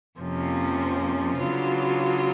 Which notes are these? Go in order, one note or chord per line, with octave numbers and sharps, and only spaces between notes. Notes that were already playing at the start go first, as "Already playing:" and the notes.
F2 C3 F3 A#3 C#4
C#3 F#3 B3 D4 F4